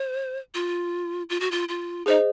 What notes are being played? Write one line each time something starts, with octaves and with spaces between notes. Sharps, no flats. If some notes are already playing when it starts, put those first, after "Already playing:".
Already playing: C5
F4
F4
F#4
F4
F4
D#4 G#4 C5 D#5